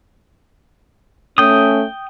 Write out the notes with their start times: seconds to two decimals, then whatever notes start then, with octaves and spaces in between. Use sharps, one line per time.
1.38 A3 C#4 G5 D#6